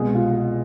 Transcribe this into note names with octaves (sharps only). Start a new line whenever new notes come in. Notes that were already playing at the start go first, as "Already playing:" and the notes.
Already playing: C2 B2 G#3 G#4
F4